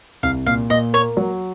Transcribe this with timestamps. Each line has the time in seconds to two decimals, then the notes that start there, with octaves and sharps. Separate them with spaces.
0.23 C2 F5
0.46 A#2 F5
0.70 A#2 D#5
0.93 A#3 C#5
1.17 F#3